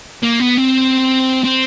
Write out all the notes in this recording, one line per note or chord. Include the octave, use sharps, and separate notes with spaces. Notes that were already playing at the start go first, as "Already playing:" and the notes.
A#3
B3
C4
C4